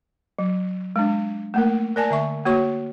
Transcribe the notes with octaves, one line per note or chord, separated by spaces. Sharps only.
F#3
G#3 D4
A3 A#3 A#4
A#4 D5 G#5 A5
D3 E5 C#6
A#3 F#4 C#5 C#6